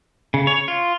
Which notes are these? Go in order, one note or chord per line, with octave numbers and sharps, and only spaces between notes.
C#3
C#5
F4